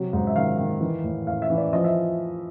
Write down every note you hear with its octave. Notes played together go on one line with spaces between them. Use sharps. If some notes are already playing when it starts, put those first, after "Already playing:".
Already playing: C3 F#3
G#2
E5
D#3 F5
D#3
E3
A2
A2 F5
E5
E3
D5
F3 D#5
E5